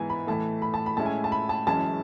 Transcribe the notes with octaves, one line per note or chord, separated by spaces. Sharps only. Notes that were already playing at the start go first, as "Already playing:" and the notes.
Already playing: G#2 E3 B3 E4 G#5
B5
A2 E3 A3 A5
B5
A5
B5
A2 G#3 C#4 E4 A5
G#5
A5
B5
A5
F#1 F#2 E3 G#3 C#4 A5